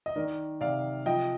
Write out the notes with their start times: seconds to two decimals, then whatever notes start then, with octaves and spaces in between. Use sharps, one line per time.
0.06 D#5
0.16 D#3 A#4 D5
0.61 C3 D5 F5
1.06 F3 D#5 G5